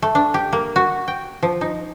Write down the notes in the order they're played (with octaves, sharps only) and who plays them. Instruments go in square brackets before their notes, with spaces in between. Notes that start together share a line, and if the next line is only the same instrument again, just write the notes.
[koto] A3
D4
G4
A#3
F#4
G5
F3
D#4